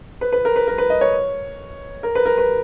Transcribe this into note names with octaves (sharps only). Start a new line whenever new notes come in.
B4
B4
A#4
B4
A#4
B4
D#5
C#5
A#4
B4
A#4
B4